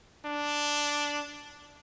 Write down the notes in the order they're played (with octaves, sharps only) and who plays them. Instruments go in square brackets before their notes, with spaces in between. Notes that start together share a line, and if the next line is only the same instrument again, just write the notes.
[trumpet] D4